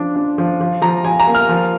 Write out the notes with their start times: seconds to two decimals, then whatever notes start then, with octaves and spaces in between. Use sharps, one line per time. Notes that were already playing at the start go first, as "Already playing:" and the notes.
Already playing: F3 D4
0.16 D4
0.38 F3
0.61 F3
0.82 F3 A#5
1.05 F3 G#5
1.20 A#5
1.27 A#3
1.35 F6
1.49 F3